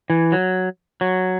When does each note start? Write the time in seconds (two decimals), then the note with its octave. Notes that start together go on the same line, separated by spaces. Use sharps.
0.10 E3
0.32 F#3
1.01 F#3